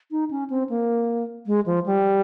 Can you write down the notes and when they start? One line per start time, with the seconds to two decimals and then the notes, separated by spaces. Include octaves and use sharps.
0.11 D#4
0.31 C#4
0.50 C4
0.70 A#3
1.47 G#3
1.66 F3
1.86 G3